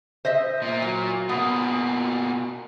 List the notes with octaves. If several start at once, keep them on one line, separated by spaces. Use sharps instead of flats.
C5 D#5 E5
A#2 A#3
F#3
B2 A#3 B3